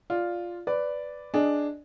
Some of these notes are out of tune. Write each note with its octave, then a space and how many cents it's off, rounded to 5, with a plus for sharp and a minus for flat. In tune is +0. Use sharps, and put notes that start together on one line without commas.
F4 +0 D5 -5
B4 +10 D5 -5
D4 +0 G#4 +10 D#5 +0